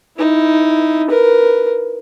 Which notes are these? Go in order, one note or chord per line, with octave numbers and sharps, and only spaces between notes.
D#4 E4
A#4 B4